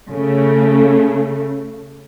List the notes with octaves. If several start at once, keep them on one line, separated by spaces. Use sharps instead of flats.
C#3 A3